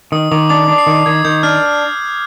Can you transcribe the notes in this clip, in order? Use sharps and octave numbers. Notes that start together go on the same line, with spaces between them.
D#3 D#6
D#3 D6
D4 D6
D4
C7
D#3
D#3 G#6
D#3 G6
D4 F6